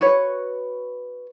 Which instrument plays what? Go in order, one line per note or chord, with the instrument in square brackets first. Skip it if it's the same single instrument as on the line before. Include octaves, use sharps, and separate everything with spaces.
[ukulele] F#4 B4 C#5